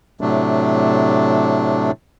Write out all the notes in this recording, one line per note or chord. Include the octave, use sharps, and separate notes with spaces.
A2 C3 F#3 A3 D4